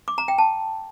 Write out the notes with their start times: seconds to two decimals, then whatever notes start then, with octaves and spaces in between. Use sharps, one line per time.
0.08 D6
0.18 A#5
0.28 G5
0.38 A5